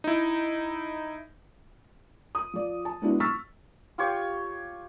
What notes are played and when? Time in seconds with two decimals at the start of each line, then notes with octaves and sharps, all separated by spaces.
0.04 D#4 E4
2.35 D#6
2.53 F3 D5
2.85 A5
3.02 G#3 B3 D4 E4 F#4
3.20 C#6 E6 F6 A6 B6
3.98 F4 G4 C#5